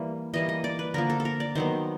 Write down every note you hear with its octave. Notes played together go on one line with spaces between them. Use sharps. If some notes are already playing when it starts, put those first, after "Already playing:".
Already playing: E3 G3 A#3
E3 G3 A#3 D#5
D#5
D5
B4
D3 F3 A#3 A#4
A4
A4
A#4
D5
D#3 F#3 B3 C5